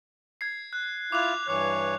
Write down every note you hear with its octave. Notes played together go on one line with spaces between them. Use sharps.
G#6 C7
F#6
E4 F4 D6 F#6 F7
G2 E3 C#5 D6 F#6